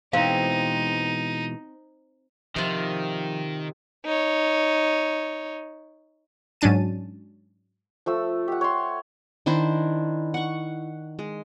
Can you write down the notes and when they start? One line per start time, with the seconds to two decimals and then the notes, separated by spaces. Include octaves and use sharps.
0.13 B2 E3 G#3 C4 D#4 F5
2.56 C3 D#3 F3 F4
4.05 D#4 C#5
6.61 G#2 F#3 C#4 D4 A5 D#7
8.06 F3 A3 E6
8.48 G4 F#5
8.61 C#5 C6
9.46 D#3 D4 E4 C5
10.34 F#5 C#6
11.19 G#3